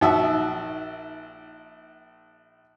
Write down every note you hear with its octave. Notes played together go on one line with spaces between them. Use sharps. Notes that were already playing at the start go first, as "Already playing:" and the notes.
A#1 D#4 F#4 E5 A5